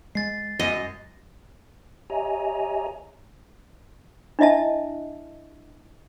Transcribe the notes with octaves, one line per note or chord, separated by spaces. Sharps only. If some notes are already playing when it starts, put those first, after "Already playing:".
G#3 A6 C7
F#2 D#5
G4 C#5 D#5 E5 G#5 A#5
D4 E4 D#5 E5 A5